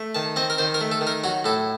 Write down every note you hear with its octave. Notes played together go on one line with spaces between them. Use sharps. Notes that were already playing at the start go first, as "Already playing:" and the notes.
Already playing: A3
D#3 A5
C4 D#5
A#4
D#3 C5
A#4
A3
A4
D#3
A#4
F#3 F#4
A2 A4